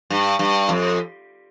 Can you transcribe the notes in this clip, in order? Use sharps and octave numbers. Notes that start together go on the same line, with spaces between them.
G2
G2
F2